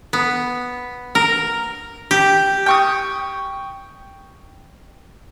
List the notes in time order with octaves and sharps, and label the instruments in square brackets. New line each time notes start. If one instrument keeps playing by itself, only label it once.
[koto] B3
A#4
G4
[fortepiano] G5 C#6 D#6